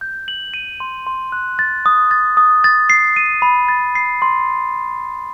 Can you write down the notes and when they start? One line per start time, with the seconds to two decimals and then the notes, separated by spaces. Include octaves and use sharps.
0.01 G6
0.28 F#7
0.54 D#7
0.80 C6
1.07 C6
1.32 F#6
1.59 A6
1.86 D#6
2.11 A6
2.37 D#6
2.64 A6
2.90 C7
3.16 D#7
3.42 B5
3.69 A6
3.95 C7
4.22 C6